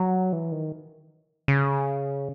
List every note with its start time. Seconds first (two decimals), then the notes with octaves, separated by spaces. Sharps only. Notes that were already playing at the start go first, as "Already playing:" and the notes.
Already playing: F#3
0.33 E3
0.52 D#3
1.48 C#3